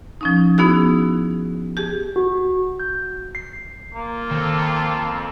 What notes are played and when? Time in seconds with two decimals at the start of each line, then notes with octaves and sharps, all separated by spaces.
0.21 F3 C#4 D#4
0.58 B3 D#4 E4 F#4 G#4
1.77 G4 G#4
2.16 F#4
2.80 G6
3.35 C7
3.95 A#3 F4
4.31 D#3 C4 A4